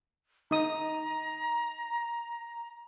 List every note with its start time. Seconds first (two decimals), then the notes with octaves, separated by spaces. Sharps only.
0.51 D#4 A#5 D#6